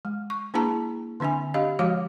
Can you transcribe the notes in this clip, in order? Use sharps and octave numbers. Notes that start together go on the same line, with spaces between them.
G#3
C#6
A#3 D4 E4 G#4 A5 A#5
D3 C4 D4 E5 G#5
D4 G4 D#5 F5
F3 G#3 F#4 C#5 F5 D6